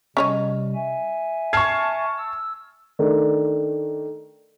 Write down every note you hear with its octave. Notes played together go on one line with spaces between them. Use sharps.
C3 G3 C#4 C#5 D#5
E5 G#5
A5 C#6 F6 G#6 C7
E6
D#3 A3 D4